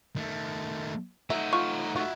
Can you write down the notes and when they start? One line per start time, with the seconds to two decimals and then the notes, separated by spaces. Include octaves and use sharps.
0.16 D#3 A3
1.30 A3 D#4 E5 F#5 A#5
1.53 F4 C#6
1.96 F4 F#4 E5